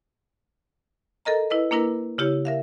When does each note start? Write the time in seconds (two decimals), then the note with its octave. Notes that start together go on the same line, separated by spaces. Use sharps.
1.25 A4 A#4 D#5 A#5
1.50 E4 B4 D#5
1.71 A#3 D4 E4 A#4 B4
2.18 C#3 E4 G4 C#5
2.45 A#4 E5 F5